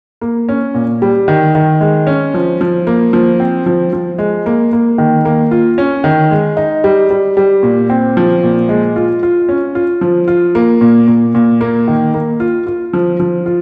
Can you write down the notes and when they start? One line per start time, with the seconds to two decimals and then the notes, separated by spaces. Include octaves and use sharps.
0.21 A#3
0.49 C#4
0.74 A#2
1.02 G3
1.28 D#3
1.55 D#3
1.81 G#3
2.07 C#4
2.34 F3
2.61 F3
2.87 A#3
3.13 F3
3.40 C4
3.66 F3
3.93 F3
4.18 G#3
4.46 A#3
4.73 A#3
4.98 D#3
5.25 A#3
5.51 F4
5.78 C#4
6.04 D#3
6.31 G#3
6.57 D#4
6.84 G3
7.10 G3
7.37 G3
7.63 A#2
7.90 C4
8.17 F3
8.43 A#2
8.69 G#3
8.96 F4
9.23 F4
9.49 C#4
9.75 F4
10.01 F3
10.28 F4
10.55 A#3
10.81 A#2
11.08 A#2
11.35 A#2
11.61 A#3
11.88 D#3
12.14 A#3
12.40 F4
12.67 F4
12.93 F3
13.20 F3
13.46 F4